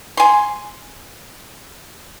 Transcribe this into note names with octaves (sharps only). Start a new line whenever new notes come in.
G#5 C6